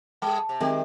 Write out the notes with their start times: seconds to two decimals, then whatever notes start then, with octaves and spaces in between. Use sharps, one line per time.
0.22 G3 G#4 A5
0.49 C3
0.60 D#3 G#3 C4 G4 E5